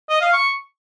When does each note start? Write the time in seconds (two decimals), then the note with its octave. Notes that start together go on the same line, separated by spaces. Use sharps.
0.09 D#5
0.21 F5
0.33 C#6